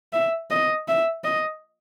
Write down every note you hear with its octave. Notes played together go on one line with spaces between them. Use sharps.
E5
D#5
E5
D#5